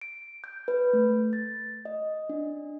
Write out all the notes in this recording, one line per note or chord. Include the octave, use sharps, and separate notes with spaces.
D7
G6
B4
A3
A6
D#5
D4